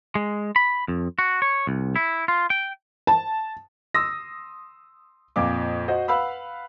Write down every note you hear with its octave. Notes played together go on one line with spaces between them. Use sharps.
G#3
B5
F2
F#4
C#5
C2
E4
F4
G5
A5
C6 D#6 E6 A#6
F2 A#2 D6
F#4 C5 D#5
B4 F5 F#5 B5 E6